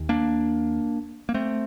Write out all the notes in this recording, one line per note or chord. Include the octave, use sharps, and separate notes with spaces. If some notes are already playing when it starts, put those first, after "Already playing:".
Already playing: D#2
A#3 D4
A#3
A3 C4